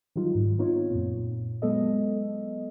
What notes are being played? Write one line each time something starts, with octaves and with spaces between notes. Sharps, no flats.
D#3 F#3 G3 D#4 F4
G#2
B3 C4 D#4 F4 C#5
F#2 A#2
F#3 G#3 B3 A4 D#5